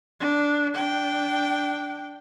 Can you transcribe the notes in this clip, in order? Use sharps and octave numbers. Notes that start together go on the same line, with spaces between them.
D4
D4 G5